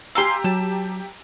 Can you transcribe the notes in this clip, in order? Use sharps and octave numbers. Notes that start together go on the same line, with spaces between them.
G4 F5 G#5 A#5 C6 E6
F#3 A5